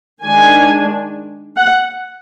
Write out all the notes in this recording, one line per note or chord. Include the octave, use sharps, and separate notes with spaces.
D#3 G#3 D4 G#5
F#5